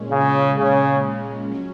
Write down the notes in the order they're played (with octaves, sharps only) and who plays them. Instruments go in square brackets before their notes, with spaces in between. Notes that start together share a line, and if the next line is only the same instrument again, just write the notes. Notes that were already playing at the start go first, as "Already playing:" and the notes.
Already playing: [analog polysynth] A#2 G#3 C#4
[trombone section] C#3
C#3
[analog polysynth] F#3 C#4